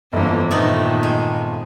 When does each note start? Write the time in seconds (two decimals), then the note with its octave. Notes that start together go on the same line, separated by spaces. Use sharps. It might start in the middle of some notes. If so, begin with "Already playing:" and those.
0.13 G1 F2 D3 E3 A#3
0.51 A#2 D#3 A3 B3 D#4
1.03 G#3